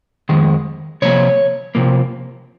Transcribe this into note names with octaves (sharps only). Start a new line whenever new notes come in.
F2 D#3 G#3
C3 F3 A#3 C#5
C3 F3 A#3